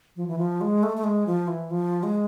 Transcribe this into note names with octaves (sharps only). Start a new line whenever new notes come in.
F3
E3
F3
G#3
A3
A3
G#3
F3
E3
F3
G#3